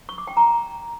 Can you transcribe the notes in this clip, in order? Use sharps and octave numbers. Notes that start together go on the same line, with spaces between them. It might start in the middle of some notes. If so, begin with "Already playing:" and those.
C#6
D6
G5
A#5